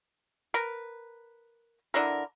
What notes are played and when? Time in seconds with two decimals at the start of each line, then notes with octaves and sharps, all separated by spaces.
0.54 A#4 B4
1.94 D3 D4 E4 A#4